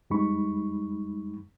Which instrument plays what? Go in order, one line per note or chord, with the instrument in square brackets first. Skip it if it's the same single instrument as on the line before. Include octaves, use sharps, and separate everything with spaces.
[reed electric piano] F2 G3 G#3 D#4 B5 C#6